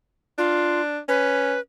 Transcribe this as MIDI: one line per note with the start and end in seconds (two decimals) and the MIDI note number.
0.38 0.99 62
0.38 0.81 65
1.08 1.55 61
1.08 1.60 71